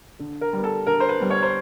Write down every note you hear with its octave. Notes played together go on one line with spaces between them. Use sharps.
D3
A#4
G3 B3
A4
D3 A#4
C5
B4
G3 B3
C#5
C5